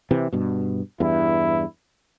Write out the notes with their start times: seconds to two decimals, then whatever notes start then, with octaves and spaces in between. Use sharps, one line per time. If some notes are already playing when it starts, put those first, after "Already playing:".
0.11 C3 E3
0.33 G2 B2
1.00 E2 G2 E4